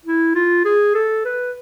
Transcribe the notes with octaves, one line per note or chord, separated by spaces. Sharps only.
E4
F4
G#4
A4
B4